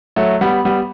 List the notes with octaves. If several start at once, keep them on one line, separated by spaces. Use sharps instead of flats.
F#3 A3
G3 B3
G3 B3